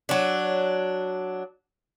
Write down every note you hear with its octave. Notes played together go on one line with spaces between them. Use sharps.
F#3 D4